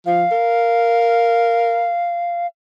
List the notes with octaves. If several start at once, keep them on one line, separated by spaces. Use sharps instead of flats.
F3 F5
A#4